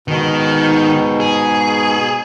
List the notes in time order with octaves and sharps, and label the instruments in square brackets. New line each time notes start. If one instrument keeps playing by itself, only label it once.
[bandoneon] G#2 B2 [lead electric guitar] D#3
[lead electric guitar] G#4